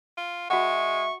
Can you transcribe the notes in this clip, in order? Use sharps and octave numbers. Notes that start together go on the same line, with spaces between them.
F4
G#3 F#4 E5 F#5 C#6